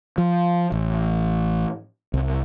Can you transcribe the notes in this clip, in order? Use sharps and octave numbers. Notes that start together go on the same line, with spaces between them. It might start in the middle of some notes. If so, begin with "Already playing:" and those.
F3
A1
C2